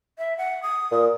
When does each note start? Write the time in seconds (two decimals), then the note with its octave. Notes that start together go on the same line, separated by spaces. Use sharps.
0.18 E5
0.38 F#5
0.63 D#6
0.91 A#2